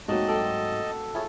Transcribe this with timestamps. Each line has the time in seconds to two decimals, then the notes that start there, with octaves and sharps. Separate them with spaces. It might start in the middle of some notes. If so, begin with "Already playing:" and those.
0.08 G#2 F#3 A3 A#3 C4 F#4 D#5 A5
0.28 A4 D5 G5 C6
1.15 E4 F4 G#4 C#5